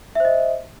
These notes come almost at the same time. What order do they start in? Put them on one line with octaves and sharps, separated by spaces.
E5 C5 D#5